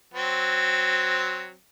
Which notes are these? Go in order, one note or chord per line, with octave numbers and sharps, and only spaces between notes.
F#3 C4